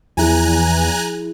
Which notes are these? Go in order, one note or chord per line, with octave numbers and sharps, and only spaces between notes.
E2 F3 E4 G#4 G#5 A#5 F#6